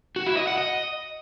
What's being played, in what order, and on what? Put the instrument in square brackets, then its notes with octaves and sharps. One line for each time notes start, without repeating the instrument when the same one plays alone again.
[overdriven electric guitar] F#4
E4
D#5
F#5
D#5